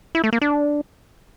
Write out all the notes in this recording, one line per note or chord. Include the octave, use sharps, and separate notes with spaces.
E4
A3
A#3
D4